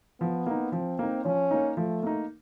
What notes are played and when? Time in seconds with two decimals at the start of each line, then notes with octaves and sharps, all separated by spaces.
0.20 F3 B3
0.46 A#3 D#4
0.72 F3 C4
0.99 A#3 D#4
1.25 F3 C#4
1.51 A#3 D#4
1.77 F3 A3
2.03 A#3 D#4